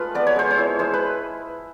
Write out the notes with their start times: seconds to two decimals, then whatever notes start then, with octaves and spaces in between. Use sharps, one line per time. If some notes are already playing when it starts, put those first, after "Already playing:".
Already playing: G#3 A3 F4 B4
0.15 B3 D5
0.27 C#5
0.36 G#3 C5
0.51 C#5
0.58 E4
0.79 G#3 C5
0.94 B4